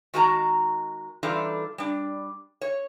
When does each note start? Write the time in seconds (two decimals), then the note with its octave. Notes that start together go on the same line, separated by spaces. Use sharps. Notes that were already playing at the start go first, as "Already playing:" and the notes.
0.14 D#3 G#3 F#4 A#4 A5 A#5
1.23 E3 G3 D4 D#4 F4 A4
1.78 G3 D4
2.61 C#5